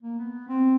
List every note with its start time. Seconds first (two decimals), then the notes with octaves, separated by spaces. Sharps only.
0.02 A#3
0.18 B3
0.48 C4